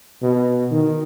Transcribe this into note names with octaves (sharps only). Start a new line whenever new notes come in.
B2
D#3